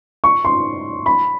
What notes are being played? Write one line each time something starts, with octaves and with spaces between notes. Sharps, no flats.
C#6
C6
B5